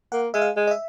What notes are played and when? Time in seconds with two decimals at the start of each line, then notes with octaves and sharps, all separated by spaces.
0.12 A#3 F#5
0.34 G#3 E5
0.42 F5
0.56 G#3
0.67 D#5
0.71 E5